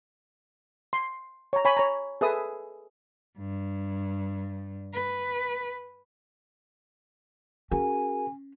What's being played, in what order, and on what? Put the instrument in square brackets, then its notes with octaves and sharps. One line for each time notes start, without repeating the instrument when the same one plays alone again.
[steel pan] C6
C#5 A#5
C#5 G#5 B5
C#5 A#5
G#4 A4 B4 E5 D#6
[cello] G2
B4
[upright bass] C#4 [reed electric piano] F#4 G#4 A#4 [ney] G#5